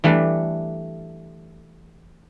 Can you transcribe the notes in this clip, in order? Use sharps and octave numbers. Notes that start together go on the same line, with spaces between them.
E3 G3 A3 D4